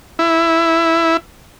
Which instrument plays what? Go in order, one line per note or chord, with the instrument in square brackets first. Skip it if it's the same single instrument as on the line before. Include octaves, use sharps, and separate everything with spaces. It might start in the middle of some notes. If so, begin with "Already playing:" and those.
[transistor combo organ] E4